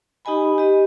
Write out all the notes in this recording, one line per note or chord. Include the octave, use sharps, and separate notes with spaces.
D#4 G4 D#5 G#5 B5
G4 D#5